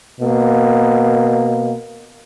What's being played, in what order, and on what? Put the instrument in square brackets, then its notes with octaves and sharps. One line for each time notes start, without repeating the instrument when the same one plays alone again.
[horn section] B2 A#3